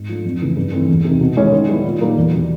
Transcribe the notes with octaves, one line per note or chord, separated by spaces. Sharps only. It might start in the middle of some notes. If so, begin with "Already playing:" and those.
Already playing: G#2
F3 A3 D4
F2
C#3 E3 A3
G2
E3 A3 C4
E2
C3 D#3
B2
G#3 C#4 E4
D#3
G3 B3 E4
A#2
G3 A#3 D#4
E2
B2 G3